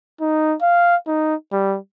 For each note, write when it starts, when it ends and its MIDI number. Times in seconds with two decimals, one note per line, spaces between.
0.21 0.55 63
0.62 0.96 77
1.07 1.35 63
1.52 1.77 55